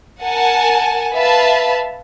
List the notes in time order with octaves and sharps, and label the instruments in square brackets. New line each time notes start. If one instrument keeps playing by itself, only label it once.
[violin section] A#4 F#5 G#5 A5
B4 E5 F5 A5 B5